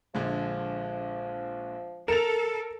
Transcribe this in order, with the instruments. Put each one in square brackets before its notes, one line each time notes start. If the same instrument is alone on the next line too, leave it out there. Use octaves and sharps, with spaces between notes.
[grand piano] A#1 D3 G#3 [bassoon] F3
[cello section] A4 [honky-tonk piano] A#4 F7 [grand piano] A6 C#7 E7